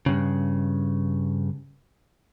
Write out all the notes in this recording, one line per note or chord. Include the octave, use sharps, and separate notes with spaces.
G2 C#3